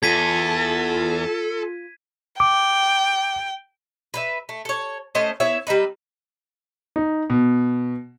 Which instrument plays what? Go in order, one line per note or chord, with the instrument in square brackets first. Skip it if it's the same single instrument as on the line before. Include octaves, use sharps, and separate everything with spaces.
[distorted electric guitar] E2 [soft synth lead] F4 [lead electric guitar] A4 [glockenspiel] G#6 B6 D#7
[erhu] G5 [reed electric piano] D6
[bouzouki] B4 C5 E5
A3
A4 C#5
A3 C#4 C5 D#5
B3 E4 C#5 E5
G3 C4 D#4 B4
[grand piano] D#4
B2